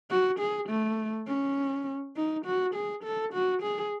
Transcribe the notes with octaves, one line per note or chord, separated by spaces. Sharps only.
F#4
G#4
A3
C#4
D#4
F#4
G#4
A4
F#4
G#4